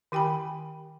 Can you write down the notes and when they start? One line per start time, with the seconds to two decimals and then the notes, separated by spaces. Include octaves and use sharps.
0.12 D#3 G4 G5 G#5 B5